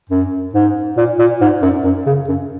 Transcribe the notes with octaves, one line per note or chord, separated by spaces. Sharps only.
F#2
G#2
A#2
A#2
G#2
F#2
F#2
C#3
F#2